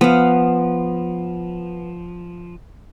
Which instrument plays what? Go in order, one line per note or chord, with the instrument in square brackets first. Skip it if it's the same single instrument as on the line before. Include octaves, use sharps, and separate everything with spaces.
[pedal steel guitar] F3 [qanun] B3 F5